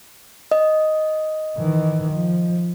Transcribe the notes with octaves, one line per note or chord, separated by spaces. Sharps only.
D#5
D#3 E3
F3